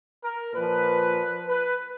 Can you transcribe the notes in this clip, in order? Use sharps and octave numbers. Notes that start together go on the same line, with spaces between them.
A#4
A#2 F3 B4
B4